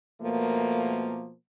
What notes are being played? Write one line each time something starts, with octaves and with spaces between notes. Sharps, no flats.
B2 F3 A3 A#3